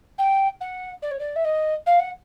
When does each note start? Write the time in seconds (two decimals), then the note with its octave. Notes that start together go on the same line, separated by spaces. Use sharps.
0.18 G5
0.61 F#5
1.02 D5
1.11 C#5
1.19 D5
1.36 E5
1.45 D#5
1.86 F5
2.00 F#5